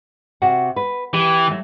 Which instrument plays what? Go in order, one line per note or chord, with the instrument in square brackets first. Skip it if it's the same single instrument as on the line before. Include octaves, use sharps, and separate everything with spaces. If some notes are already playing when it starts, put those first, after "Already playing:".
[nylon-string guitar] C3 F#4 F#5
B4
[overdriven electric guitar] E3 [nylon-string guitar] G4 G5
[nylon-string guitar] F#3 A3